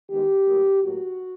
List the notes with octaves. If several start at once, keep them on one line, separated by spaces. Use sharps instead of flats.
D#3 G#3 B3 G4
A2 F#3 A#3
A2 F#3 A#3 F#4